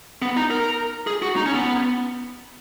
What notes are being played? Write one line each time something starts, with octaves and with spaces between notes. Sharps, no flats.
B3
D#4
A#4
G#4
F#4
D#4
C#4
B3